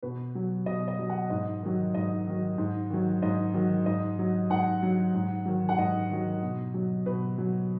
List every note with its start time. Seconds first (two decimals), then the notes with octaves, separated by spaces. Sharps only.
0.03 B2 B4
0.35 F#3
0.66 B2 D#5
0.88 D#5
0.99 F#3
1.10 F#5
1.30 G#2 D#5
1.63 D#3 F#3
1.94 G#2 D#5
2.27 D#3 F#3
2.58 G#2
2.90 D#3 F#3
3.22 G#2 D#5
3.54 D#3 F#3
3.86 G#2 D#5
4.19 F#3
4.50 G#2 F#5
4.83 F#3
5.14 G#2
5.45 D#3 F#3
5.69 F#5
5.78 G#2 D#5
6.10 D#3 F#3
6.42 B2
6.74 F#3
7.06 B2 B4
7.38 F#3